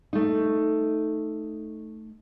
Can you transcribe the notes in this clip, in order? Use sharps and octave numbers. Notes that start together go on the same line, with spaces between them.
A3 D#4